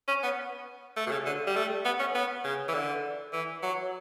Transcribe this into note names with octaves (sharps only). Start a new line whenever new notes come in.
C#4
B3
A3
B2
C#3
D3
G3
A3
B3
C#4
B3
C#3
E3
D3
E3
F#3